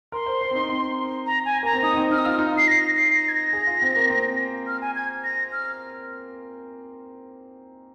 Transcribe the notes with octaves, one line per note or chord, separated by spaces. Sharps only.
A#4 C6
C5
C5
C4
D#4
C4
A#5
G#5
A#3 A#5
C4
D#4 D#6
D#4
C4
D#4 F6
D#6
F4 F6
D#4
F4
C7
A#6
C7
A#6
G#6
A#6
G#4
F4
C4
A#3
C4
F6
G#5
G#6
A#6
F6